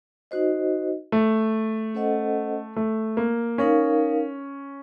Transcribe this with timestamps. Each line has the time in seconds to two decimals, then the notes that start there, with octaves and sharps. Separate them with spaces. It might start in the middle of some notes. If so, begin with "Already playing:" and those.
0.31 D#4 F#4 C5 D#5
1.12 A3
1.95 C#4 A4 C5 D#5 F#5
2.76 A3
3.17 A#3
3.58 C#4 D#4 A#4 F5